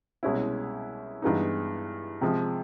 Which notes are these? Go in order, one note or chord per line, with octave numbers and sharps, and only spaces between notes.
C2 B2 G#3 C#4 E4
G2 E3 G#3 B3 D#4
C3 F3 G#3